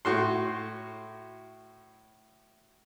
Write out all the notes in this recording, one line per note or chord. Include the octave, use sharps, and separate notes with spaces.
A2 F#4 C6